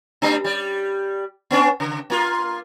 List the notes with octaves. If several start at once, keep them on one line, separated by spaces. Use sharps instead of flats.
G3 A3 D4
G3 D5
B3 C#4 D4
C#3
A#3 F4